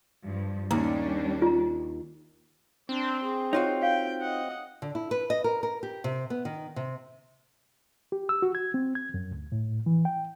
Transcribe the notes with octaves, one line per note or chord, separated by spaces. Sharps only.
G2 F3
D#2 G3 C#4 D4 A#5
F4 A#5
C4 D4 C6
G#4
D#4 F4 F#4 C#5
F5 G5
D#5 F#5
D3
E4
B4
D#5
A#4
A#4
G4
C3
B3
D#3
C3
G4
E6
F#4
G#6
C4
G#6
F#2
D2
A2
E3
G5